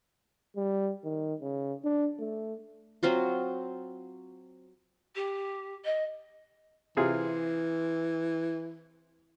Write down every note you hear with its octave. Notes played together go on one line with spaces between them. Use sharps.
G3
D#3
C#3
D4
A3
F#3 C4 F4 F#4
G4
D#5
C3 E3 F4 G#4